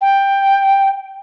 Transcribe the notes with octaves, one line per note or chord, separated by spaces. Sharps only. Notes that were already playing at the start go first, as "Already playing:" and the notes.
G5